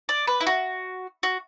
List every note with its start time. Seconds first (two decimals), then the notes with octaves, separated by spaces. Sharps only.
0.09 D5
0.27 B4
0.41 E4
0.47 F#4
1.23 F#4